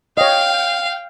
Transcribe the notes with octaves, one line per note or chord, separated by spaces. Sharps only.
C#5 D#5 F5 G5